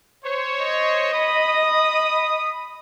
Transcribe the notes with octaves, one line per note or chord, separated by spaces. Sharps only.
C5 C#5
D#5
B5 D#6